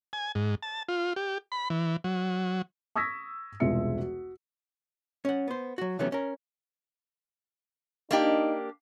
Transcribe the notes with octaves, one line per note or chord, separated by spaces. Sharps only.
G#5
G#2
A5
F4
G4
B5
E3
F#3
C#6 D#6 E6 G#6 A#6 B6
E1 C2 G#3 F4 E5 C#7
F#4
C#4 F#5
B3 C5
F#3 F#4
C3 E3 F#3 A3 B3 C#4
C#4 A#4
A#3 D4 D#4 G4